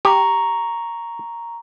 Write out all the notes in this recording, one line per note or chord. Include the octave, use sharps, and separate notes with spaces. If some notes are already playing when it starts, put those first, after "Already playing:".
G4 A#5 C#6